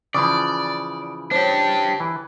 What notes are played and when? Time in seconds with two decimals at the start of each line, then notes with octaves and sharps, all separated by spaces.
0.14 C#3 E3 F3 D5 D6 D#6
1.31 D4 G4 C5 C#5
2.00 E3